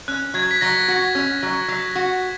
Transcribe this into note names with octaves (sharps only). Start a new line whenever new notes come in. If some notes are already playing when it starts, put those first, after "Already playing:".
C#4 F#6
F#3 G#6
B6
F#3 A#6
F#4
C#4
F#3
F#3
F#4